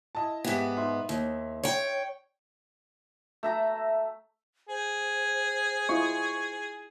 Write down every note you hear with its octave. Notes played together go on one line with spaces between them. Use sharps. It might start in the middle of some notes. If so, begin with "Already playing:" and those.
E4 D#5 A5
G#2 B3 G4 E5 B6
D#4 E5 C6
D#2
C#5 G5
A3 E5 A#5
G#4 C5
E4 F4 D#5 C#6